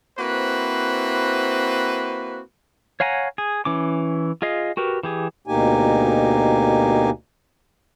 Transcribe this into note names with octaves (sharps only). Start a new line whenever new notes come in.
A#3 C4 E4 F#4 B4 C5
C#5 F5 F#5 G#5 A#5
G#4
E3 C#4 D6
F4 G#4 D#5 F5
F#4 G4 A#4 B4
E3 G4 G#4
D2 B2 A#3 D#4 G4 G#5